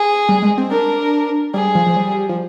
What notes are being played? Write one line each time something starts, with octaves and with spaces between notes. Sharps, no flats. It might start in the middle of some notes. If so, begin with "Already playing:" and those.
Already playing: G#4
G3
G#3
C4
D4 A#4
G3 G#4
F3
F3
G3
F3